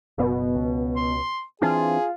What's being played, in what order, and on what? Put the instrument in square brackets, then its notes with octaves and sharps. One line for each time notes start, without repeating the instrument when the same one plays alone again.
[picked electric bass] F#1 B3 [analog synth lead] B2
[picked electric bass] C#2
[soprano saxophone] C6
[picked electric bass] E3 C4 D4 [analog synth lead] F4 [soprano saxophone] G#4